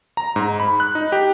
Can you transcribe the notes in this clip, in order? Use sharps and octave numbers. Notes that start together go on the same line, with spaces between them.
A#5
G#2
B5
F#6
D#4
G4